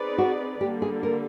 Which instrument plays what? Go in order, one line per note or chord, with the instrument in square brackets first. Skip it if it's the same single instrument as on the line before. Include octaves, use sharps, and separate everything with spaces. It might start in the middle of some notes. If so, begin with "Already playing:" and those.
Already playing: [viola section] C4 D#4 G#4 B4 D5
[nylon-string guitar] F#4
[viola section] D3 G3 A#3 [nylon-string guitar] G4
[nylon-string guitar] G#4
A#4